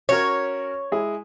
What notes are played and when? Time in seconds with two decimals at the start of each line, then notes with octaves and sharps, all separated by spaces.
0.09 C#4 F#4 A#4 C#5
0.92 G#3 E4 G#4